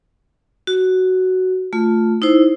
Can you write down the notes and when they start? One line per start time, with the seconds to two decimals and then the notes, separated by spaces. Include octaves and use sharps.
0.67 F#4
1.73 A3 F4
2.22 D#4 E4 C5